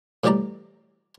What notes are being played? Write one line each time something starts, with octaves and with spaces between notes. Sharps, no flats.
A2 E3 G3 G4 D5 A#5